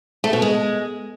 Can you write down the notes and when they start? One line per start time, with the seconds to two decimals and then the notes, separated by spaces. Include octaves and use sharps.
0.24 A3
0.33 B2
0.42 G#3